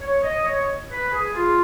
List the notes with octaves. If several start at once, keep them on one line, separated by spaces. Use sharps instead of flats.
C#5
D#5
C#5
B4
G#4
F4